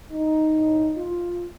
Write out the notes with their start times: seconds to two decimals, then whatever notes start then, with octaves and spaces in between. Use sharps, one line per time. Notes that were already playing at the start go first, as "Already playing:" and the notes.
0.11 D#4
0.54 A2
0.96 F4